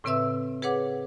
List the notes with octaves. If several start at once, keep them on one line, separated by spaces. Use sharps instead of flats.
A2 C#3 C4 B4 E5 E6
G#4 B4 C#5 F#5 D6